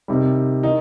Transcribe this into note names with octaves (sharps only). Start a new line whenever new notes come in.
C3 D#3 G3
D#3 D#4